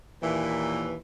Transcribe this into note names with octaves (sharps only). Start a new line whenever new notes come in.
D#2 A#2 E3